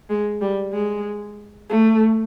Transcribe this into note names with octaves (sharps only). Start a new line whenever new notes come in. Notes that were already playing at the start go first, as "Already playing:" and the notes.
G#3
G3
G#3
A3